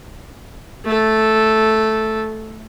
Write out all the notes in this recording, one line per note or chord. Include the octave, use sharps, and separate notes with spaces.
A3 A4